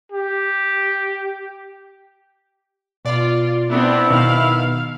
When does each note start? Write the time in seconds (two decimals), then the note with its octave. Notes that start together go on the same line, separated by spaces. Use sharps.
0.12 G4
3.05 B2 F4 D5
3.70 B3 C4 D4 E4
4.10 B2 D#3 F5